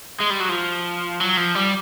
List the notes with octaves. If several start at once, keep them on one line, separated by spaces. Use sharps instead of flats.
G#3
G3
F#3
F3
F#3
F3
G3